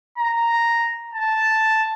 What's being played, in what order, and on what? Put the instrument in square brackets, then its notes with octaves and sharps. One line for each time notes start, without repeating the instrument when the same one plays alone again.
[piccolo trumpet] A#5
A5